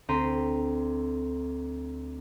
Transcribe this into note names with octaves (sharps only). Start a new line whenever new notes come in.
D2 C4 A#5 C6 B6 D#7